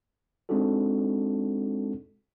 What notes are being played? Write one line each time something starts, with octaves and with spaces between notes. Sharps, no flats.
G#3 C4 D4 D#4 F#4 A4